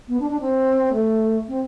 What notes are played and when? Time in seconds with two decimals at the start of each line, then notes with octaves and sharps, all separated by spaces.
0.08 B3
0.20 D4
0.30 D4
0.40 C4
0.93 A3
1.48 C4